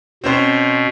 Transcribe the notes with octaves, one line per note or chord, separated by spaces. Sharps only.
B2 C4 C#4 C5